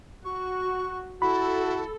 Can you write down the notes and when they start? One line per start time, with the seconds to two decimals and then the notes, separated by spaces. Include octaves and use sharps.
0.25 F#4 C#6
1.22 E4 F#4 A4 B5